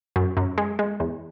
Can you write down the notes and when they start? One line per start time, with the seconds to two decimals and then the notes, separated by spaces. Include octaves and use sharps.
0.16 F#2
0.37 F#2
0.58 G#3
0.79 G#3
1.00 E2